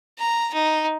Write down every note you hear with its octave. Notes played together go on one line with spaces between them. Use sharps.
A#5
D#4